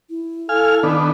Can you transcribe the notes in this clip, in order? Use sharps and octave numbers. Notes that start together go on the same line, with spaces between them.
E4
A4 F5 G#5 F6
D#3 B3 D4 A5